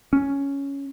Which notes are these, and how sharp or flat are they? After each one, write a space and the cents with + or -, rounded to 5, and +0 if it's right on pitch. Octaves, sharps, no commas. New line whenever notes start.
C#4 +5